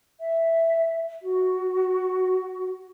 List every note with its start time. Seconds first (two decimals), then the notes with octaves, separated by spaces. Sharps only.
0.19 E5
1.21 F#4